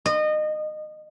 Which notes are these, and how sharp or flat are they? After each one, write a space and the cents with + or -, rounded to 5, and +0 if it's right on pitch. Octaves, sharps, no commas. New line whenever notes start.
D#5 -25